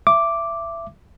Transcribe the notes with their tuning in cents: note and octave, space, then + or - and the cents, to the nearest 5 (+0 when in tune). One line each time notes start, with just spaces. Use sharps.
E5 +20 D6 +0